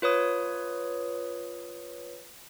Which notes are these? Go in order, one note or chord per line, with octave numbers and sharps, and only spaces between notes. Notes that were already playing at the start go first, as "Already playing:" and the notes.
F4 B4 C#5 D#6